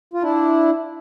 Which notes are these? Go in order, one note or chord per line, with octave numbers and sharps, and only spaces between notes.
F4
D4 E4